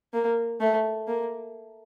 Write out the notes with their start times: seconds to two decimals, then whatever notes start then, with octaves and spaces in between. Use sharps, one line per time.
0.13 A#3
0.61 A3
1.08 A#3